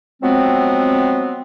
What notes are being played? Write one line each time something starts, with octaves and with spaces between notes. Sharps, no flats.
F3 F#3 G#3 B3 C4